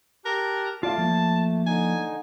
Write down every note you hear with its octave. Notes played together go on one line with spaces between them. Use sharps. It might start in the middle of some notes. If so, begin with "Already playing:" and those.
G4 A#4 A5 F#6
A3 F4 D5 F5 A5
F3 A#3
D3 D#4 G#5